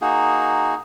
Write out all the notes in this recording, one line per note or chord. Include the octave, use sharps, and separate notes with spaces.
A#3 D#4 F#4 G#4